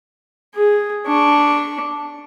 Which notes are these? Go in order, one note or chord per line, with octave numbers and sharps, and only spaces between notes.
G#4
D4 C#6